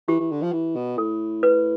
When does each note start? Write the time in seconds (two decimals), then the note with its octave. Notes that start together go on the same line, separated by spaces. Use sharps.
0.08 E3 G4
0.20 E3
0.31 D3
0.42 F3
0.53 E3
0.76 B2
0.98 A2 A4
1.43 B4